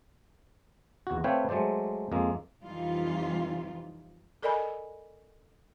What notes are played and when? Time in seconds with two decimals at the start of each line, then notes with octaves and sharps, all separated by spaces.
1.07 E2 F#4
1.24 A3 C4 B4 C#5 F5 G5
1.49 F#3 G#3 A3 C5 D5
2.12 F2 G#3 A#3
2.63 F2 C3 E3 G3 D#4 F4
4.43 A4 A#4 D5 D#5 G#5 B5